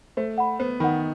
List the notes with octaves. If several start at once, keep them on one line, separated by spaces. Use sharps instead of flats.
A3 C5
F#5 B5
B3 C5
D#3 F#5 B5